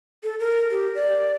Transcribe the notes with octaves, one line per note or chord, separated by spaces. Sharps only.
A4
A#4
G4
D5